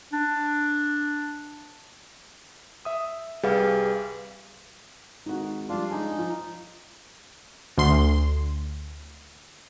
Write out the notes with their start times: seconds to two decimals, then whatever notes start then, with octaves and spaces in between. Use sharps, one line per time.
0.13 D4
2.85 E5 D#6
3.43 C2 G3 G#4 B4 F5
5.26 G#1 D#4 F#4
5.69 F3 G3 D4 F4
5.91 G#2 D4 D#4 G#5
6.18 F3 F4
7.77 D2 C6